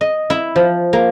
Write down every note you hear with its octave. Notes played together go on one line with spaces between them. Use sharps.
D#5
E4
F3
A#3